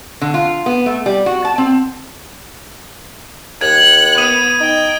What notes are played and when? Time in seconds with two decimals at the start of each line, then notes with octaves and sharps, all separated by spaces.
0.21 D3
0.34 F4
0.66 B3
0.86 A3
1.06 G3
1.26 F#4
1.45 A5
1.58 C4
3.61 D#2 F#6 G#6 C#7
4.18 B3 D#6 D#7
4.60 D#4 G5